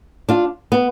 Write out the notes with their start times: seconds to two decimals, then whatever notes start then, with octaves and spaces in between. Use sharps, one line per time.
0.29 D4 F4
0.72 B3